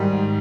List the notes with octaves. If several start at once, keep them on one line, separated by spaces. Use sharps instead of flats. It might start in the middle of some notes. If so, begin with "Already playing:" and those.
Already playing: G#2 D#3 G3